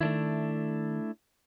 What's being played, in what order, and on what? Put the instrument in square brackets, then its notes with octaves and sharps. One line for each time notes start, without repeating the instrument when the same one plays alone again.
[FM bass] D#3 [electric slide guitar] A3 D4 E4